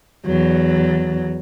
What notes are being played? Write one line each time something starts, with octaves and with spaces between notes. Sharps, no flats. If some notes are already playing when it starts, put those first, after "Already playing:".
E2 F#3